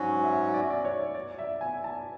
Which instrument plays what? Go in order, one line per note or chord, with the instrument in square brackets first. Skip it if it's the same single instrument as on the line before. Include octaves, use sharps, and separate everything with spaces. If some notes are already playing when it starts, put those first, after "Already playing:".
Already playing: [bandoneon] G#2 F#3 C#4 F#4 [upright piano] D5
[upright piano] E5
D5
E5
D5
C#5
D5
E5
G#5
A5